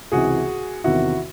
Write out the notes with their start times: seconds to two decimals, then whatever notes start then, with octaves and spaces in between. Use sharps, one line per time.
0.12 C#2 C3 E3 F#4 G#4
0.84 E2 C3 D#3 E4 F#4